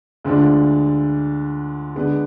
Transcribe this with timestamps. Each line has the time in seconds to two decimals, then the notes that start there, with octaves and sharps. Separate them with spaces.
0.25 D2 D3 G#3 D4 F4
1.95 D3 G#3 B3 D4